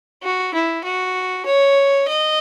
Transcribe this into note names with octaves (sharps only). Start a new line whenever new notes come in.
F#4
E4
F#4
C#5
D#5